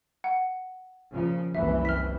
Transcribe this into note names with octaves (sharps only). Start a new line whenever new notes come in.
F#5
A#2 C#3 F3
F#1 C2 E3 E5
F6 B6